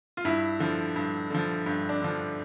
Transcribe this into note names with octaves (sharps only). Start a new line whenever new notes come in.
F4
G2 E4
D3 F3
G2
D3 F3
G2
D4
D3 F3